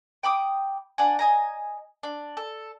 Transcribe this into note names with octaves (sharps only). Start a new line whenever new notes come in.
G5 B5 D6 D#6
D4 F#5 G#5
D#5 G#5 A#5
D4
A4